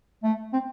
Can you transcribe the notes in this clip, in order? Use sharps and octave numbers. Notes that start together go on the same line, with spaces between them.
A3
C4